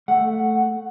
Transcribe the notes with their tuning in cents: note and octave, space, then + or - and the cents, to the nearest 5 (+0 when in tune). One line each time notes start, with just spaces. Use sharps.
A3 +0 F#5 +0